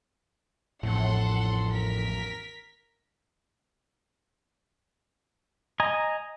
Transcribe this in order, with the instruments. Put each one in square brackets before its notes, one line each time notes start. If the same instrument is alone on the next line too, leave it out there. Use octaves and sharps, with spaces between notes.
[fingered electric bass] A1 F2 [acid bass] A2 [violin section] A4 F#5 C6
[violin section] A#4 B6
[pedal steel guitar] D#5 G#5 A#5